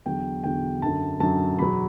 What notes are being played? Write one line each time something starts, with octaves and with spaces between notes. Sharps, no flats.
E2 D3 F#3 G5
E2 D3 F#3 G5
F#2 D3 F#3 A5
F#2 D3 F#3 A5
E2 B2 F#3 B5